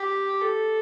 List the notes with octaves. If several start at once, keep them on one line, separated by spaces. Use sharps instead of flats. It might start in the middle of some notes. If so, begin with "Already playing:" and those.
Already playing: G4
A4